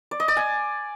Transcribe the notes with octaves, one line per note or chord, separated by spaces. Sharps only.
D5
D#5
D5
G#5